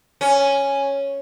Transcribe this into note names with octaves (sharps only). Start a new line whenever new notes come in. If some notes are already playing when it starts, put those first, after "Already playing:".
C#4